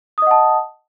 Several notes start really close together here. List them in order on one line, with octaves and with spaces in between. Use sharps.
D#6 D#5 F#5 A5